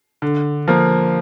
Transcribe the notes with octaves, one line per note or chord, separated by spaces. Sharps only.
D3
F3 A#3